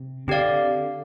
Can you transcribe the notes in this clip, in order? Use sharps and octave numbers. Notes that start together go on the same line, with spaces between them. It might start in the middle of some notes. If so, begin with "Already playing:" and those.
Already playing: C3
D3 C4 G4 D5 F5